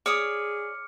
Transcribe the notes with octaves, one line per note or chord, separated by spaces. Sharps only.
G#4 C#5 D5 D6 D#6 F6 C#7